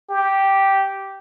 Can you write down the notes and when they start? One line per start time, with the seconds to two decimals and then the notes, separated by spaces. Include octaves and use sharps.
0.10 G4